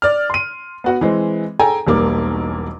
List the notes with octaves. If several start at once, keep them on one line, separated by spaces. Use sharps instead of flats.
D5 F6
C6 D#7
B3 F#4 F#5
E3 G#3 C4
G#4 A4 G5 G#5 A#5
E1 B1 G3 A#3 D6